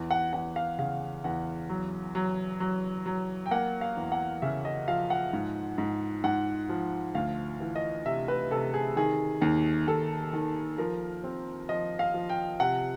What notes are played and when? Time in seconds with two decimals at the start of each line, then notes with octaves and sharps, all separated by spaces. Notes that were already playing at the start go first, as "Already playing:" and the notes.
Already playing: E2
0.11 F#5
0.33 E2 F#5
0.56 F5
0.78 C#3 F5
1.24 E2 F#5
1.69 F#3
2.15 F#3
2.60 F#3
3.06 F#3
3.46 G5
3.51 A#3 F#5
3.81 F5
3.97 E2
4.12 F#5
4.42 C#3 E5
4.65 D#5
4.88 F3 F5
5.10 F#5
5.33 G#2
5.78 G#2
6.24 G#2 F#5
6.69 F3
7.15 D2 F5
7.60 E3
7.76 D#5
8.06 C3 E5
8.28 B4
8.51 C3 A4
8.74 G#4
8.96 D#3 G#4
9.41 D#2
9.87 D#2 A4
10.33 D#3
10.78 F3 A#4
11.24 C4
11.69 F3 D#5
11.99 F5
12.14 F3
12.29 G5
12.60 C3 F#5